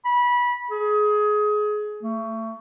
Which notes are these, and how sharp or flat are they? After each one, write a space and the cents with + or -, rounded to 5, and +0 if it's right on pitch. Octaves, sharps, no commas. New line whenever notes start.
B5 -20
G#4 +20
A3 +30